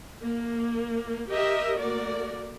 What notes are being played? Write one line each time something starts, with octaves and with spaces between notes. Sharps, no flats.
A#3
G4 A#4 D#5 E5
A3 A#3 F#4 A#4 D5